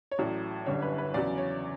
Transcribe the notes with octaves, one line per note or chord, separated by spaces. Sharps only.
C#5
A1 A2 F#3 D5
G1 F#2 D3 G3 C#5
B4
B4
E2 C#3 F#3 D5
C#5